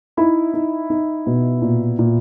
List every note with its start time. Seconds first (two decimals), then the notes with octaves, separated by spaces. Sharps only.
0.17 D#4 E4 E5
0.54 D#4
0.90 D#4
1.27 B2
1.62 A#2
1.99 A#2